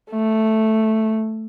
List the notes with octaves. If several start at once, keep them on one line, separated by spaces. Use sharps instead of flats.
A3